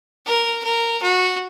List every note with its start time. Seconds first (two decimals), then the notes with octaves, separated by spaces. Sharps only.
0.26 A#4
0.64 A#4
1.02 F#4